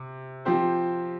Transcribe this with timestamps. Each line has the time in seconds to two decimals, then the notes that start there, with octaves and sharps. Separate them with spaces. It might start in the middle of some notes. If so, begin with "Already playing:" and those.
Already playing: C3
0.45 F3 C4 G4 C5